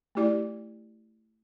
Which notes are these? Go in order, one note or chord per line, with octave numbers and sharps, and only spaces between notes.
A3 E4 G4 D5